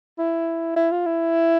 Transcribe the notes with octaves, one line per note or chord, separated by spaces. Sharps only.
E4
E4
F4
E4